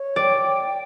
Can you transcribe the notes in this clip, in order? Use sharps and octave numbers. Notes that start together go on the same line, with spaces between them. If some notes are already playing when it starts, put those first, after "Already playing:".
Already playing: C#5
D5 G5